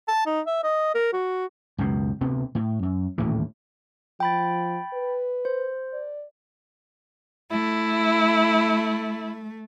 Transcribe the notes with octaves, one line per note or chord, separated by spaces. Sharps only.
A5
D#4
E5
D#5
A#4
F#4
C#2 F#2 B2
D2 C3 B3
A2
F#2
D#1 D2 A2 E3
F3 G5 B5 A6
B4
C5
D5
A3 E4